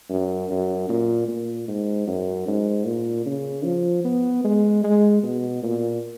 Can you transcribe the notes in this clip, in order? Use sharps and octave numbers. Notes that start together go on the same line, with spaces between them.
F#2
F#2
A#2
A#2
G#2
F#2
G#2
A#2
C#3
F3
B3
G#3
G#3
B2
A#2